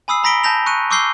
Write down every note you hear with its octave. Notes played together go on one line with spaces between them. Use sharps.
G#5 B5 D#6 E6 C7
A#5 B5 A#6 B6 D7 G7
A5 G6 A#6 F7
C#6 F#6 C#7 D#7
C#6 D6 E6 G6 C7 G7